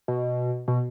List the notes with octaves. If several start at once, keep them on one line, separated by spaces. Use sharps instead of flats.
B2
B2